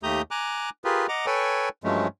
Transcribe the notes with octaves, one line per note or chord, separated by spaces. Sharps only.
D#2 A3 G4 A#5 D#6 G6
G#5 A#5 D6 F#6
F4 G4 G#4 A#4 B4
D#5 F#5 A#5 D6
A4 B4 C#5 G5 G#5
G2 F3 F#3 G#3 A3 C#4